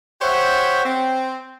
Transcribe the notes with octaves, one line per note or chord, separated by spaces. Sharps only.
G4 C5 C#5 E5 F#5
C4